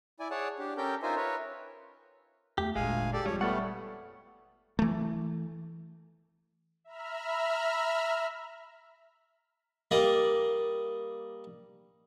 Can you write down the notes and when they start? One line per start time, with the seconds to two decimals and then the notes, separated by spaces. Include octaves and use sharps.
0.20 E4 D5 G#5
0.31 G#4 C#5 D5 F#5 A5
0.59 D4 G4
0.77 C#4 G4 A4 A#4 G5 G6
1.03 D#4 F4 A#4 C5 E5 G#5
1.16 A#4 B4 C#5 E5
2.58 E2 A3 G4
2.76 G1 D2 A#2 G#3 F5 G#5
3.13 G4 A4 D5
3.26 F2 G3 G#3 F4 C#5
3.41 G3 A3 B3 A4 F#5 C#6 F6 A6
4.79 E3 A3
6.84 E5 A#5 B5 F6
9.91 G3 A#3 D5 D#5